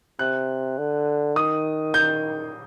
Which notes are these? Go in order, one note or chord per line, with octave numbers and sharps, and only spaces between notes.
C3 F#6
D3
D#3 D#6
G6